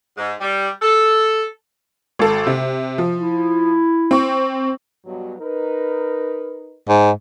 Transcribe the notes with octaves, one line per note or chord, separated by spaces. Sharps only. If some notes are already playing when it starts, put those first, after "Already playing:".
G#2
G3
A4
G#1 A4
C3
F3
E4
C4 C#6
G2 B2 F#3
D#4 A#4 B4
G#2